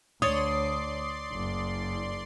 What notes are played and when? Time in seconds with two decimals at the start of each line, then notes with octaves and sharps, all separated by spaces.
0.22 D2 C#5 D5 C6 D#6
1.33 F#1